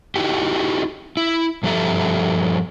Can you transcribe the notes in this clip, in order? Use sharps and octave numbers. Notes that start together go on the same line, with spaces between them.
D#4 E4 F#4 G4
E4
G2 F3 G4 A4 E5 A#5